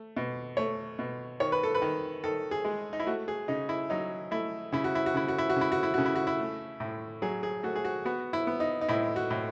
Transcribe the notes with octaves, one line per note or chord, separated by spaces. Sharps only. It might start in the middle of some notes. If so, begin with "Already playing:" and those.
Already playing: A3
B2
A3 C#5
B2
D#3 C#5
B4
A4
B4
D#3
D#3 A4
G#4
G#3
D#4
E4
A3 F#4
G#4
C#3 D#4
E4
F#3 D#4
A3 E4
C#3 E4
F#4
E4
F#4
C#3 E4
F#4
E4
F#4
C#3 E4
F#4
E4
C#3 F#4
E4
F#4
E4
A3
A2
F#3 G#4
G#4
A3 F#4
G#4
F#4
B3 F#4
E4
B3
D#4
D#4
A2 E4
F#4
A2